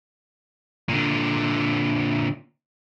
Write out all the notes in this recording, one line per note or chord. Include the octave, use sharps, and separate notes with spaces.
A#2 D3